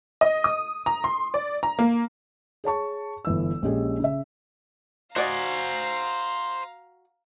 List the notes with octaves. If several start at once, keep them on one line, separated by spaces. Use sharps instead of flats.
D#5
D#6
A#5
C6
D5
A#5
A#3
G#4 C#5 A5 C#6
G1 E3 E6
A#1 G#3 C#4 G4 G#4
C#3 E5
F#4 C5 D5 D#5 F5 G#5 A#5